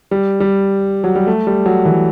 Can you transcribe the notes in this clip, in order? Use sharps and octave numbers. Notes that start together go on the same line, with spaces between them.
G3
G3
F#3
G3
A3
G3
F#3
E3